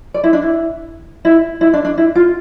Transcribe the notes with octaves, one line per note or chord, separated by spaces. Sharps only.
D5
E4
D4
E4
E4
E4
D4
D4
E4
F4